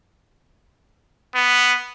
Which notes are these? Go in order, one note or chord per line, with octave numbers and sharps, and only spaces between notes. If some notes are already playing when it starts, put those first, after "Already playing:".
B3